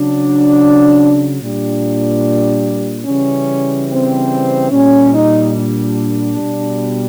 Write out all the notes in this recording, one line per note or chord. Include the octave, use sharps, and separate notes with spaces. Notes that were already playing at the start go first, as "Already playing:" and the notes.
Already playing: C#3 F#3 D4
A#2 G3 D4
C#3 E3 G3 C#4
C4
A#2 G3 C#4
D#4
D4
B2 G3